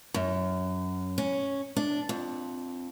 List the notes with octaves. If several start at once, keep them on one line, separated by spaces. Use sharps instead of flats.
F#2
C#4
D4
F2